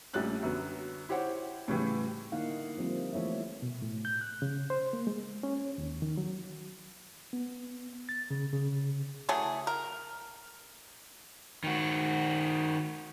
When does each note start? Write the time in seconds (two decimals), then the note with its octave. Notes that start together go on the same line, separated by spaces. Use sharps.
0.14 A#1 G3 A3 C#4 F#6 A6
0.42 F#2 D3 F#3 B3
1.09 E4 G4 C5 C#5 F#5
1.68 A2 C#3 E3 G3
2.32 D3 A#3 D#4 E4 F5 F#5
2.77 F3 G3 A#3 C4
3.13 E3 A3 E4 C#5 E5
3.62 B2
3.82 A2
4.05 G6
4.21 F#6
4.42 C#3
4.70 C5
4.93 A#3
5.07 G#3
5.43 C#4
5.78 D#2
6.02 D#3
6.17 F#3
7.33 B3
8.09 A6
8.31 C#3
8.53 C#3
9.29 E3 F#3 A3 G#4
9.67 A#4
11.64 D#3 F#4